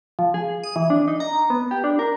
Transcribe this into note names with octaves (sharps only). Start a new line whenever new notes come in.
F3
G#4
D#6
E3
D4
D#4
A#5
B3
G4
D4
A#4